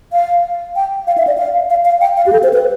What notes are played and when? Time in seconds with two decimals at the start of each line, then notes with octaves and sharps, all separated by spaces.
0.13 F5
0.76 G5
1.07 F5
1.18 E5
1.27 D5
1.38 F5
1.70 F5
1.85 F5
2.01 G5
2.17 F5
2.26 G4
2.33 A4
2.43 C5
2.53 B4